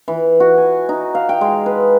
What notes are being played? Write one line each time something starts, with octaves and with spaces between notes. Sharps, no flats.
E3
F#4
G#5
D#4
F5
G5
G#3
B4